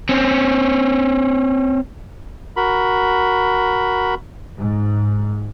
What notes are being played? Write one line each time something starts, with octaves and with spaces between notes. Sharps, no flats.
C4 C#4
F#4 A#4 B5
G#2